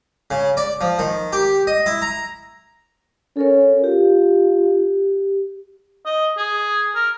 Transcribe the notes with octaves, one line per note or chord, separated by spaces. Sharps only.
C#3
D5
F3
D#3
G4
D#5
E4
A#5
C#4 A4 A#4 C#5
F4 G4
D#5
G#4
A#4